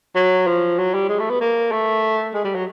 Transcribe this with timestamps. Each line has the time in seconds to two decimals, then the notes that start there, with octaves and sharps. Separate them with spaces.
0.16 F#3
0.47 F3
0.79 F#3
0.94 G3
1.09 G#3
1.19 A3
1.30 B3
1.41 A#3
1.72 A3
2.34 G#3
2.44 G3
2.55 F#3